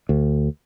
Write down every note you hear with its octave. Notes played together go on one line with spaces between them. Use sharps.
D2